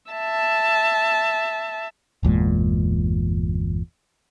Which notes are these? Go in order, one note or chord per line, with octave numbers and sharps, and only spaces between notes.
E5 A5
G1 E2 A#2 G#3